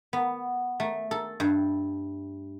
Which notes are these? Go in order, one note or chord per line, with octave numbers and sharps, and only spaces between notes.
B3
A3
A4
G2